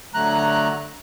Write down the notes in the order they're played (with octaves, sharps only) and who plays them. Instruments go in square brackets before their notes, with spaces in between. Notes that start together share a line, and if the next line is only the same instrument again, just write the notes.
[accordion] D3 F#3 A3 A#5 F#6